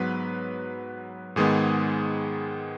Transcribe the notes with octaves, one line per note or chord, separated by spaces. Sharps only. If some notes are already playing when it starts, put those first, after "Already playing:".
Already playing: G#2 F#3 B3 B4
G#2 D#3 G#3 B3 G#4